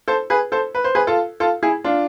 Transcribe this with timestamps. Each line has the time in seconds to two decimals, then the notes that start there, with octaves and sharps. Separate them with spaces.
0.08 A4 C5
0.30 G#4 B4
0.52 A4 C5
0.75 B4
0.84 C5
0.95 G#4 B4
1.07 F4 A4
1.40 F4 A4
1.63 E4 G#4
1.84 D4 F4